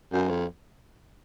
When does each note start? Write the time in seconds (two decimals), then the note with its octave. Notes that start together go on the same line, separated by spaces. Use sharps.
0.12 F#2
0.30 F2